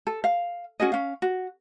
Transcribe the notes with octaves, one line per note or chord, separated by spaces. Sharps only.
A4
F5
C#4 F#4 G#4 D#5
C#4 F5
F#4